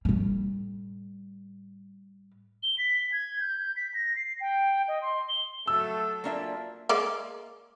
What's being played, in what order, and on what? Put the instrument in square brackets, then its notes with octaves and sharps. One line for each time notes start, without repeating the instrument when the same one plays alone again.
[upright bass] A2 G3
[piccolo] G7
B6
G#6
G6
B6
A#6
C7
G5
D#5
C6
G7
[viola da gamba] F#3 A4 [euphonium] A3 [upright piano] E6
[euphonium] A#2 [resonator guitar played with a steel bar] A#3 D4 E5
[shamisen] G#3 A#3 D5